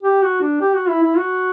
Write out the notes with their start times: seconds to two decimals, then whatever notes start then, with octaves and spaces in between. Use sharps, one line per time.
0.03 G4
0.23 F#4
0.41 D4
0.61 G4
0.74 F#4
0.89 E4
1.03 E4
1.17 F#4